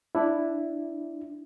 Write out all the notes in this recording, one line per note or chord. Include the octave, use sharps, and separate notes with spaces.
D4 E4